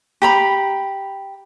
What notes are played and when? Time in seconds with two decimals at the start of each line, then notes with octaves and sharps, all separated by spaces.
0.22 G4 A#5 B5